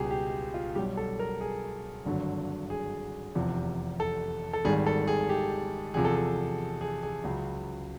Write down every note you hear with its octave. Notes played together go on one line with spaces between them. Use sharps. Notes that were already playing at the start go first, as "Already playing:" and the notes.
Already playing: C#2 B2 G3 G4 G#4
G4
F4
B1 B2 G3 G4
A4
A#4
G#4
G#1 G2 D3 F#3
G#4
F1 E2 C3 F3
A4
A4
G#1 G#2 D#3 G3 G#4
A4
G#4
G4
E2 C3 F3 G#4
A4
G#4
G#4
G#4
C#2 C#3 F#3